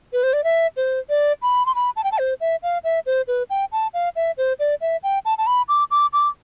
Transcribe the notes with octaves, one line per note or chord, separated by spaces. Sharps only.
B4
C5
D5
E5
C5
D5
B5
C6
B5
A5
G5
A5
C5
E5
F5
E5
C5
B4
G5
A5
F5
E5
C5
D5
E5
G5
A5
A5
B5
D6
D6
D6